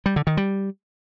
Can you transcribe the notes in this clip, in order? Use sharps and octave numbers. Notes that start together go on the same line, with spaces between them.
G3
D3
D#3
G3